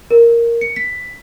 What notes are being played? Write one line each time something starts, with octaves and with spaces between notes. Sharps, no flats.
A#4
C#7
B6